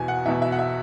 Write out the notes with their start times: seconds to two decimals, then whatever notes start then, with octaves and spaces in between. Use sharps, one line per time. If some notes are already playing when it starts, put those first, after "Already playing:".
Already playing: E2 B2 G#5
0.08 F#5
0.25 E2 E5
0.28 B2
0.42 E5
0.52 F#5
0.59 E5